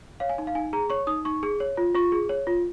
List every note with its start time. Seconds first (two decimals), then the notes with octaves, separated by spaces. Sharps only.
0.20 C#5 F5
0.29 G#5
0.38 D#4
0.47 F5
0.55 D#4 G#5
0.73 G#4 A#5
0.90 C#5 C#6
1.07 D#4 D#6
1.25 D#4 C#6
1.43 G#4
1.60 C#5
1.77 F4
1.95 F4 C#6
2.12 G#4
2.29 C#5
2.47 F4